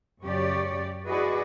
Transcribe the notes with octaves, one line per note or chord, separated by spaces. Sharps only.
F#2 C#3 G4 C#5 D5
E4 F#4 G#4 B4 D5 D#5